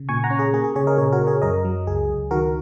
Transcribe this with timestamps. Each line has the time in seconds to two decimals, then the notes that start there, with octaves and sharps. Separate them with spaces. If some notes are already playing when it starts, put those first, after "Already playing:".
Already playing: C#3
0.09 A#2 G#5 C#6
0.24 F#5 A#5
0.30 C#4
0.39 G#4
0.53 A#3 G#4
0.64 G#4
0.76 C#3 G#4 C#5
0.87 A#4 D#5
0.97 A#2 G#4 C#5
1.12 F#4 A#4
1.19 A#2
1.27 G#4 C#5
1.42 F#2 A#4 D#5
1.65 F#3
1.87 C#2 G#4
2.10 C#2
2.31 D#3 F#4 A#4